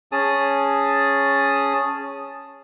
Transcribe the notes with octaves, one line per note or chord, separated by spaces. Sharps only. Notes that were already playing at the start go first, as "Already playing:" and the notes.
C#4 G#4 A5 D#6